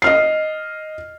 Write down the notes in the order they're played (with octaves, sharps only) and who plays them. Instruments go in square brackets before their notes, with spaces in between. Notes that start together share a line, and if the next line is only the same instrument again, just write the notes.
[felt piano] D#5 F6 C7